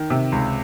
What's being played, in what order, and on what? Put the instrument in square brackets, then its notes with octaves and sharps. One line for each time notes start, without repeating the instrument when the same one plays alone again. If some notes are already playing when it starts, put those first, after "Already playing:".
Already playing: [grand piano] D#3
C3
C#2